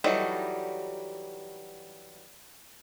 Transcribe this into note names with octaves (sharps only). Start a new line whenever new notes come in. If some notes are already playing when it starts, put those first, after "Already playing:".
E3 F#3 G3 D#4 A4